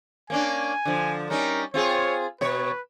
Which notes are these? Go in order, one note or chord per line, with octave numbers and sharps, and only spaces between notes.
A#3 C#4 D4 G#5
D3 F3
G3 C#4 D#4 A#4
C4 F4 G#4 C#5
B2 B4 C#5